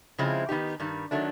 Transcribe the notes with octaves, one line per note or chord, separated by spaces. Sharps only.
C#3 F3 G#3 C4 E4
D#3 F#3 B3 D#4 G4
G2 D#3 G3
D#3 F#3 A3 D4